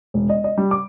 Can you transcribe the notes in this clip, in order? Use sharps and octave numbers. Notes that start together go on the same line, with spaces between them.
E1
D#5
D#5
G3
D6